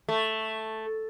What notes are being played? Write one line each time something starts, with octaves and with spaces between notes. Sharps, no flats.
A3